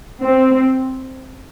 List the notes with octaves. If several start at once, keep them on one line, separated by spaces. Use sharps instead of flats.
C4